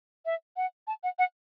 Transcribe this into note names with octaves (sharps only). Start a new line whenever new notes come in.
E5
F#5
A5
F#5
F#5